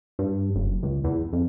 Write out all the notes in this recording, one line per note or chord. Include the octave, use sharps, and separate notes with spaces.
G2
F#1
C#2
E2
F2